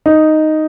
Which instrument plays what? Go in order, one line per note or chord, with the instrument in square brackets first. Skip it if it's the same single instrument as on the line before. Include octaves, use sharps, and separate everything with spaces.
[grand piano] D#4